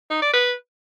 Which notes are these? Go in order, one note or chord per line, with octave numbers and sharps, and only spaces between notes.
D#4
D5
B4